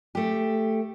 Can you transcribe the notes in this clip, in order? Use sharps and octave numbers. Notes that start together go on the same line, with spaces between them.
A3 G4